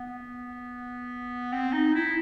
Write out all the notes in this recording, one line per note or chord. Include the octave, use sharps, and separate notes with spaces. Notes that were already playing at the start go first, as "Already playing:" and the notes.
Already playing: B3
C4
D#4
E4